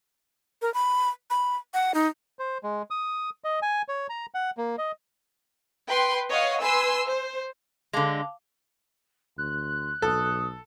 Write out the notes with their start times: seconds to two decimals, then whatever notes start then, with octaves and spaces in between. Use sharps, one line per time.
0.62 A#4
0.74 B5
1.30 B5
1.74 F#5
1.94 D#4
2.39 C5
2.63 G#3
2.91 D#6
3.44 D#5
3.62 G#5
3.88 C#5
4.09 A#5
4.34 F#5
4.57 A#3
4.78 D#5
5.87 B4 G5 C6
6.31 C#5 D#5 F5 F#5
6.60 B4 G#5 C6 E6
7.06 C5
7.93 D3 G#3 F5 A5 D6
9.38 D2 C6 F#6
10.02 B1 A4 D#6